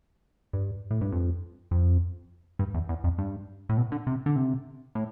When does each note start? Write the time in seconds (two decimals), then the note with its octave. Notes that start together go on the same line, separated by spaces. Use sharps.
0.53 G2
0.91 A2
1.01 G2
1.12 F2
1.71 F2
2.59 G2
2.74 E2
2.89 E2
3.04 F2
3.18 G2
3.69 A2
3.77 B2
3.92 D3
4.07 C3
4.26 D3
4.36 C3
4.95 A2